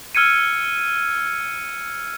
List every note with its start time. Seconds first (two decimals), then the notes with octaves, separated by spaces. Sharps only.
0.15 E6 F6 G#6 C#7 D#7